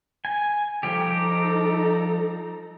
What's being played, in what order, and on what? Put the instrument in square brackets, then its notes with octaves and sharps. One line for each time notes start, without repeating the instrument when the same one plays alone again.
[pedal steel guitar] G#5
[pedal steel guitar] F3 G3 G4 [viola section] D#4 A4 A#5